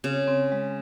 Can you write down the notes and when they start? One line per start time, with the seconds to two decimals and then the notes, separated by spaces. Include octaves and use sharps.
0.04 C#3 C4
0.28 C4
0.52 G#3